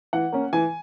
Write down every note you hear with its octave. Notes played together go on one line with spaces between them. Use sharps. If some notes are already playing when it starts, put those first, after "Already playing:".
E3 F#5
A#3 C#4
E3 G#5